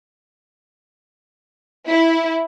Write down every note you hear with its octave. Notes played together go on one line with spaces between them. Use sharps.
E4